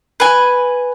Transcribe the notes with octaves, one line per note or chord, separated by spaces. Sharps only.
B4 G#5